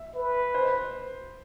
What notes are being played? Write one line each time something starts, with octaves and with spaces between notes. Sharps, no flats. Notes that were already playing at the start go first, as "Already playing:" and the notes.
Already playing: E5
B4
C5